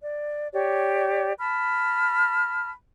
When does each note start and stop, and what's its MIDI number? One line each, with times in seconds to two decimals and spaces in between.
0.02 0.47 74
0.53 1.31 67
0.53 1.31 73
0.53 1.31 74
1.38 2.70 81
1.38 2.70 83
1.38 2.70 89